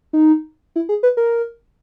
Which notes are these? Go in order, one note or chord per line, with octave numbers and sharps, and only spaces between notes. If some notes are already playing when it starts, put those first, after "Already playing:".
D#4
E4
G#4
B4
A#4